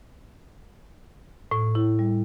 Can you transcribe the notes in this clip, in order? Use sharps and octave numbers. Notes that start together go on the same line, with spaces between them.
A2
E4
G3